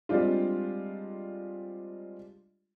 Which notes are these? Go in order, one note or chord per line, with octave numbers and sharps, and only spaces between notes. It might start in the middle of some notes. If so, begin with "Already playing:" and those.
G3 G#3 C4 D4 F4